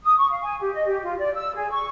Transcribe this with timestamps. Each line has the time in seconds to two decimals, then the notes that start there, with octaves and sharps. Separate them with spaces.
0.03 D#6
0.17 C#6
0.30 F5
0.42 G#5
0.60 G4
0.73 D#5
0.86 G4
1.03 F4
1.19 D5
1.34 E6
1.54 G#4
1.70 C#6